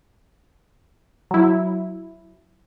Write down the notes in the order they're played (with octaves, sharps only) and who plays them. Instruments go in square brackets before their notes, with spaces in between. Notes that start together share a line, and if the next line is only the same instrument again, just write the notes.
[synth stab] F#3 E4